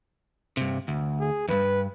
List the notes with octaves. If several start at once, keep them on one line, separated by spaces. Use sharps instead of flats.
G2 C3
D2
G#4
E2 G2 B4